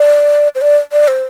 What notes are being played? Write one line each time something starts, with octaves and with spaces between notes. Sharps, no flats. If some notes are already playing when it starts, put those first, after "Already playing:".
Already playing: D5
C5
D5
D5
C5